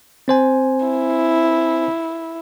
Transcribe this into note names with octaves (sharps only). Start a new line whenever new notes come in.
C4 C5 G#5
E4